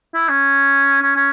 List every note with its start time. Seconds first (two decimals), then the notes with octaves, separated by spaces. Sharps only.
0.14 E4
0.29 C#4
1.02 C#4
1.16 C#4